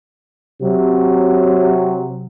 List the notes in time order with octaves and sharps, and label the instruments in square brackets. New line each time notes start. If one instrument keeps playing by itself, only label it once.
[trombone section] C3 F#3